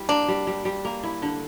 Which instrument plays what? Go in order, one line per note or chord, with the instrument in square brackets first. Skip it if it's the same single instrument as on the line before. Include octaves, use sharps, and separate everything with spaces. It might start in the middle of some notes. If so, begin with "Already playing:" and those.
Already playing: [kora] G3 E4
[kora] A#3 [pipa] D4
[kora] G3
G3
G3
A#3
E4
D3